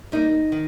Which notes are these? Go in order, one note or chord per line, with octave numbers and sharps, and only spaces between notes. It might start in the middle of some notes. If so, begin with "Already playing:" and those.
G3 A#3 D#4
D#3